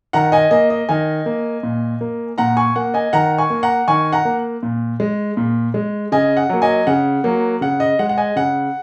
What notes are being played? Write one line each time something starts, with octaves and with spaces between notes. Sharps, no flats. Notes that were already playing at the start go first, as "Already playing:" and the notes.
D#3 F#5 A#5
D#5 G#5
A#3 D#5
D#5
D#3 D#5 G#5
A#3
A#2
A#3
A#2 F#5 A#5
G#5 C#6
A#3 F#5
D#5 G#5
D#3 F#5 A#5
G#5 C#6
A#3
F#5 A#5
D#3 G#5 C#6
F#5 A#5
A#3
A#2
G#3
A#2
G#3
C#3 D#5 G#5
F#5
F#3 A#3
D#5 G#5
C#3 F#5
F#3 A#3
C#3 F#5
D#5
G#3 F#5
F#5
D#5 G#5
C#3 F#5